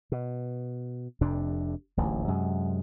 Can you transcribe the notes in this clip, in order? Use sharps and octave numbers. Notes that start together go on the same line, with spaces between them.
B2
F1 F2 C3 D4
D1 A1 D#2
F#2 C3 G#3